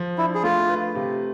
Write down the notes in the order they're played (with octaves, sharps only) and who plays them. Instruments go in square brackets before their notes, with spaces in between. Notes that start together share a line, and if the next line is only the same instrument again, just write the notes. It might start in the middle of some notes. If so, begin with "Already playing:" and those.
Already playing: [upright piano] F3
[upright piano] D4 [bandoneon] E4
[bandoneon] G#4
[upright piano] A3 [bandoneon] F4
[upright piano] B4
C3